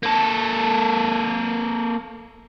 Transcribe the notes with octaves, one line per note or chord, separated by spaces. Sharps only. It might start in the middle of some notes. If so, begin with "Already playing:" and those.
A#3 A4